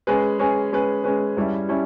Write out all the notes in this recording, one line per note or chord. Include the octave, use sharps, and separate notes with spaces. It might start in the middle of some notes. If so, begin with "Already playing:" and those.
G#3 C#4 G#4 B4
G#3 C#4 G#4 B4
G#3 C#4 G#4 B4
G#3 C#4 G#4 B4
G2 G3 C#4 E4
G3 C#4 E4